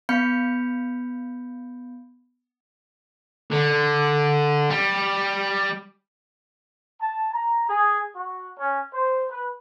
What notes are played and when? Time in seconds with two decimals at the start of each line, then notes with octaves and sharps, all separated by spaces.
0.09 B3 F5 B5 G6 C#7
3.52 D3
4.70 G3
7.01 A5
7.34 A#5
7.69 G#4
8.16 F#4
8.58 C#4
8.94 C5
9.30 B4